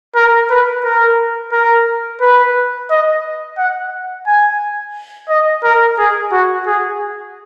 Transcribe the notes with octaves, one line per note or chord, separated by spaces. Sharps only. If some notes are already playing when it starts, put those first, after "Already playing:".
A#4
B4
A#4
A#4
B4
D#5
F#5
G#5
D#5
A#4
G#4
F#4
G#4